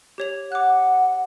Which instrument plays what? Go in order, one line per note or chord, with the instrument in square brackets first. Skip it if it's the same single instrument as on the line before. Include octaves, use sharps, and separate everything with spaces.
[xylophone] G4 C#5 F7
[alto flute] F#5 [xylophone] D6 F#6